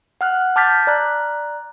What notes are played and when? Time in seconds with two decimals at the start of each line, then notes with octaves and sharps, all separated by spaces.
0.21 F#5 F6 F#6
0.56 A5 D6 F6 G6 A6 B6
0.87 D5 A#5 F#6